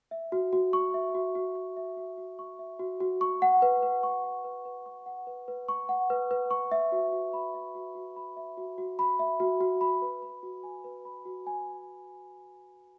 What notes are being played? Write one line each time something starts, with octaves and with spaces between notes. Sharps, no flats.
E5
F#4
F#4
C#6
E5
F#4
F#4
C#6
E5
F#4
F#4
C#6
E5
F#4
F#4
C#6
F#5
B4
B4
C#6
F#5
B4
B4
C#6
F#5
B4
B4
C#6
F#5
B4
B4
C#6
E5
F#4
F#4
B5
E5
F#4
F#4
B5
E5
F#4
F#4
B5
E5
F#4
F#4
B5
B4
B5
F#4
G#5
B4
B5
F#4
G#5